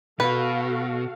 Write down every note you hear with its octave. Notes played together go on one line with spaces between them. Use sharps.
B2 F#4 A4 B4 F5